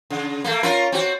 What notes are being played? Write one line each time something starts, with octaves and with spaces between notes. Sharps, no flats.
C#3
A3 A#3
C#4 F4 A#4
C4 F#4